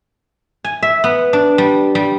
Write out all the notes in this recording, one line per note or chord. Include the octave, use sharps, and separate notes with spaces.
G#5
E5
B3
D4
G3
G3